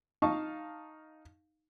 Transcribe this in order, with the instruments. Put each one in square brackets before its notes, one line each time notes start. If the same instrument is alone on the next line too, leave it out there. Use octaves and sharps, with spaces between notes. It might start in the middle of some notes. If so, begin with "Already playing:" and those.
[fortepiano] D#4 F5 A5 C#6